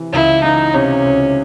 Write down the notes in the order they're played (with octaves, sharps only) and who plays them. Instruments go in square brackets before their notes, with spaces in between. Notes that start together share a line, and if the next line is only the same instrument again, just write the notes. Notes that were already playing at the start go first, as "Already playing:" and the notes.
Already playing: [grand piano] C3 E3
[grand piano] C#2 [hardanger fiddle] E4
[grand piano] E3 [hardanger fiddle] D#4
[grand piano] C3 [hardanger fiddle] C#4
[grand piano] C#2